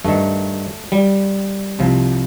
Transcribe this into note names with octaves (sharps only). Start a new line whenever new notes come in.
G2 D#3 A3
G3
C2 C3 F3